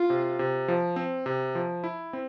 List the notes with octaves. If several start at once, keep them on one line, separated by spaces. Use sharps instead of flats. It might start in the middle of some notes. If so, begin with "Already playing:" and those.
Already playing: F4
C3
C3
F3
C4
C3
F3
E4
C4